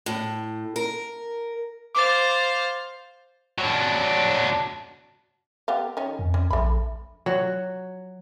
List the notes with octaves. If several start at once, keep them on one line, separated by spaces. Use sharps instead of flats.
A2
A#4
C5 F5 D6 A6
F#3 D4
B3 G4 F5
D#3 C#4
F2
C#4
A#1 A3 B5
F#3